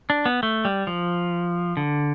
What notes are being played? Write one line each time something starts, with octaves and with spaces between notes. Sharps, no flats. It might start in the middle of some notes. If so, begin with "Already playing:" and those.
D4
B3
A3
G3
F3
D3